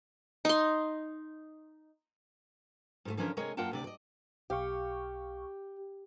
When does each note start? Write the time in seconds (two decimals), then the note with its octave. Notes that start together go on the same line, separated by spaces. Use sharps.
0.45 D#4 C6
3.05 G#2 D3 A3
3.17 D3 E3 F3 C#4 D4 A#4
3.37 C3 G#3 A#4 C#5 D#5 G#5
3.57 F#2 A#3 F4 F#5 G5 A5
3.71 D2 C3 D5
3.84 D5 D#5
4.50 B1 G4 F5 C#6